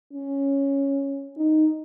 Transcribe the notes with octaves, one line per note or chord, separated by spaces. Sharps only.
C#4
D#4